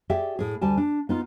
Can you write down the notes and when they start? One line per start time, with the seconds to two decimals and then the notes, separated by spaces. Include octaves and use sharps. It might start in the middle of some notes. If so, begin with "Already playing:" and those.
0.10 G4 G#4 D5 E5 G5
0.39 A2 G#4
0.61 D2 G3 G#5 A5
0.77 D4
1.09 B3 D#4 F4